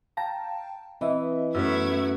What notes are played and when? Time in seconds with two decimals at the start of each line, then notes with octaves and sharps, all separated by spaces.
0.17 F5 G5 A5 A#5
1.01 E3 C4 D#5 E5
1.55 F#2 A3 B3 C#4 E4 B4 E6 G#6